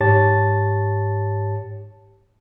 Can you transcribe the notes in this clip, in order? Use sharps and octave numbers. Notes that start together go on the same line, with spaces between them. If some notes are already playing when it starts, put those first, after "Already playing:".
G#2 G4 C#5 A5 A6